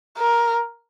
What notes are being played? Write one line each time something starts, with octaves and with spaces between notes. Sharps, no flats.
A#4